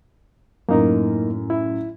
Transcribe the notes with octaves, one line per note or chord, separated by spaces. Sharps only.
F#2 A2 A#3 D#4 A#4
E4